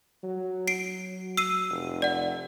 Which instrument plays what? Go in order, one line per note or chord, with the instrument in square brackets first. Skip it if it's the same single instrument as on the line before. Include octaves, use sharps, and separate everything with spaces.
[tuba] F#3
[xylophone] C7 D7
E6 C7 D#7
[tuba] F1
[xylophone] D5 F#5